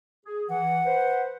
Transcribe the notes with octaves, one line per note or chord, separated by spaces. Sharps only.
G#4
E3 F#5
B4 C5